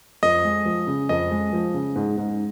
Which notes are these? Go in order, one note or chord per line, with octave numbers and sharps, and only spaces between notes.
F2 D#5
G#3
F3
C#3
F2 D#5
G#3
F3
C#3
G#2
G#2